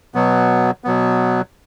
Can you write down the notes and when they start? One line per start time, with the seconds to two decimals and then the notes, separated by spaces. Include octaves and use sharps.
0.14 B2 F#3 B3
0.84 B2 F#3 B3